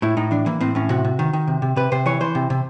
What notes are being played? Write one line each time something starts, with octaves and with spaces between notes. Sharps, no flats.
A2 E4
A2 D#4
E3 D4
E3 A#3
A2 C4
A2 C#4
C3 F#4
C3
D#3
D#3
C3
C3
C3 B4
C3 C5
E3 C#5
E3 C5
C3
C3